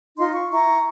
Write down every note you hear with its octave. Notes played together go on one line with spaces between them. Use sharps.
D#4 F4 C6
C#6
E4 A#5 C#6